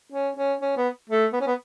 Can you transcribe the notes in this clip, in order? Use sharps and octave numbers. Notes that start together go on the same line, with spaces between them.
C#4
C#4
C#4
B3
A3
B3
C#4
B3